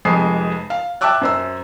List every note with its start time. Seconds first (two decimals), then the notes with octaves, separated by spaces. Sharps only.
0.05 F1 F2 G#3 D#6 C7
0.70 F5
1.01 E5 G5 A5 D6 E6 F#6
1.21 F#2 C5 E6